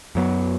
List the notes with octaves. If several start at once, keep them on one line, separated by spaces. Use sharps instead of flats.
F#2 F#3 B3